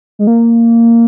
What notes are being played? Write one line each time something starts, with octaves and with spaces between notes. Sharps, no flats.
G#3
A#3